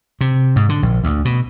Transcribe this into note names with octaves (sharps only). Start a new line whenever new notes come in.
C3
G#2
D3
A#1
D2
B2